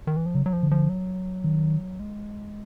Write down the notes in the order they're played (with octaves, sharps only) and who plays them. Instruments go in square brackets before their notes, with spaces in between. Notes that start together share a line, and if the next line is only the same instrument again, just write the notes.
[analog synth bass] D#3
E3
F3
[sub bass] C#3 [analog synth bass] F#3
[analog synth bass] F#3
F3
[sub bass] D3
[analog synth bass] F3
F#3
[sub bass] D#3
[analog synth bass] G#3